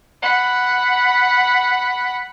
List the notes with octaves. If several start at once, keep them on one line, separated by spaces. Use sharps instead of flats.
F#5 B5